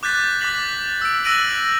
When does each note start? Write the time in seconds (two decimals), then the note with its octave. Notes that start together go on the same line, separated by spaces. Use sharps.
0.03 D6 F#6 G6 A6 B6
0.41 D6 F#6 A6 B6 F#7
1.01 E6 D7
1.24 E6 F#6 A#6 D7 D#7 F#7